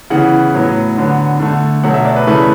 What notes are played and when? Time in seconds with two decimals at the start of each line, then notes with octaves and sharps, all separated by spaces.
0.10 C#3 E3 B3 F#5
0.54 A2 F#3 B3
0.98 D3 F#3 B3
1.40 D3 A3
1.84 B2 F#3 A3 F#5
1.94 E5
2.05 D5
2.16 B4
2.27 C#3 E3 A3 B4